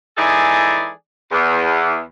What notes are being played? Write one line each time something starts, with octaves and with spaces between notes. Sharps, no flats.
E3 G#3 D#4 G#4 A4 D5
E2